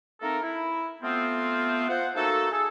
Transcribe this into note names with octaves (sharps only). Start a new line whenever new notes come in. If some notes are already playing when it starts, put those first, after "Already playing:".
A3 A#3 C4 D#4 A4 A#4
E4
A3 B3 C4 F4
F4 C5 F#5
A3 A#3 D#4 F#4 A4
G#4 A4